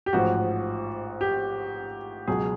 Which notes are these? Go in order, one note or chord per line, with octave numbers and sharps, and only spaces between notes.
G4
A1 G#2 F3 F#4
G4
C#2 B2 F#3 G#4